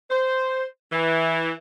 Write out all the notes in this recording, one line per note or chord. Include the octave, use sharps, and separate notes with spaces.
C5
E3